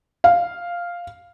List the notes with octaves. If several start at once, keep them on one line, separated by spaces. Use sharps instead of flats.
F5